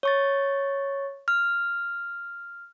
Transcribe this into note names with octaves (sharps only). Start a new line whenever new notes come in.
C#5 C#6 A6
F6